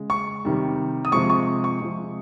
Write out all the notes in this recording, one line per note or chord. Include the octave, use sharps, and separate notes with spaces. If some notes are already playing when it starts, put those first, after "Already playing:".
Already playing: C#3 G#3
C#6
C3 D#3 G3
D#6
C3 F3 G#3 C#6
C#6
C#6
C3 F3 G#3